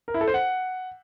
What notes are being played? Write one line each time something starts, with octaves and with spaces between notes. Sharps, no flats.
A#4
E4
A4
C5
F#5